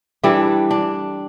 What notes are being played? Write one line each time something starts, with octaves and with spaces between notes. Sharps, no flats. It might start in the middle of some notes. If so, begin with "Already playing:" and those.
E3 G3 D4 A4
D4